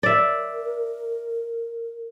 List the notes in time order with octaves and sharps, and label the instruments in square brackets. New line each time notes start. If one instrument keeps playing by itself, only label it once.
[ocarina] A#4 [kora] D5 E5